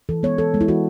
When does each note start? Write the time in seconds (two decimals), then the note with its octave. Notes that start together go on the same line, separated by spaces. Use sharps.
0.09 E3 A4
0.23 G#3 B3 C#5
0.38 E3 A4
0.54 G#3 B3
0.61 E4
0.68 E3 F#4